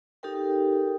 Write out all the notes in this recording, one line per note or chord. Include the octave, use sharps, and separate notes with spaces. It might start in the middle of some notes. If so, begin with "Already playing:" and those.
D#4 G4 A4 A#4 G5